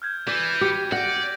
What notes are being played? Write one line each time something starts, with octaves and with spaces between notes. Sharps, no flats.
F6 G6 G#6
E3 D5 G6 D#7
G4 D6 B6 C#7
D5 F#5 A#6